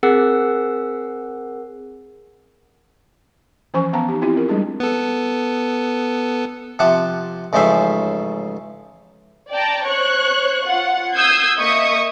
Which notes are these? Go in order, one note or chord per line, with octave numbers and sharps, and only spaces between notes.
C4 G#4 A#4 F#5 E6
E3 F3 C#4 C5 G#5 C#6
B3 F5 A5 A#5
D#4 G4
C4 E4 F4 G4
C4 A#4
G3 G#3 D4 G#4
B3 A4
C3 F3 F#5 A5 D6
A1 G#2 C#3 F3 C5 E5
D5 G5 A5 A#5
C5 C#5 C#6 F#6
F4 F#5
D#6 E6 G6 G#6 C7
A#3 D#5 E5 C#6 D#6